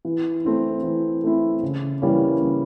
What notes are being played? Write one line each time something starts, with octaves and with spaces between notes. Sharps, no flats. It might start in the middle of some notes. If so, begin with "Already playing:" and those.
E3
A3 C4 E4
E3
A3 C4 E4
C#3
E3 G3 A#3 C#4
C#3